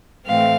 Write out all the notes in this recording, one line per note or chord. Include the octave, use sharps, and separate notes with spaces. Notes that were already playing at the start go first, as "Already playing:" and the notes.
A2 E3 A3 C4 F5